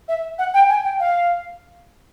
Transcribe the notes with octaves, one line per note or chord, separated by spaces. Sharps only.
E5
F#5
G5
G#5
G5
F5